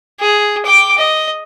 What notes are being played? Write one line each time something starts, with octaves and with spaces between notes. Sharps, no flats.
G#4
G5 D6
D#5